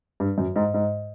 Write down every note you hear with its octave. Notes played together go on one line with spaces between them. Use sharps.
G2
F#2
G#2
G#2